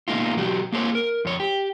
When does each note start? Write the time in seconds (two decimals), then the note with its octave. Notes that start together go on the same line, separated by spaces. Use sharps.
0.08 B2 D#3 G#3 A#3 D#4 F4
0.36 B2 F#3 F#4 G4
0.72 A#3 G#4 C5 C#5
0.95 A#4
1.25 F2 C#5
1.40 G4